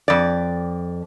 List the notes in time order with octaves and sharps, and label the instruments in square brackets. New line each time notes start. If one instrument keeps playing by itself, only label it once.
[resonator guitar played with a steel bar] F2 D5